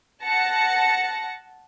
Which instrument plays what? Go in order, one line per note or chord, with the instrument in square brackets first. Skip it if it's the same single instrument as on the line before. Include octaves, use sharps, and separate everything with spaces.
[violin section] F#5 A5 A#6 C#7